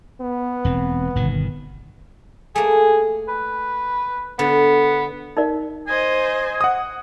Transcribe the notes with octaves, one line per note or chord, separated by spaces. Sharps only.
B3
E1 C4
G1 B2 D#3
A3 A#3 G#4
B4
D3 B3
D#4 A#4 D5
C5 D#5 G#5
F#5 D#6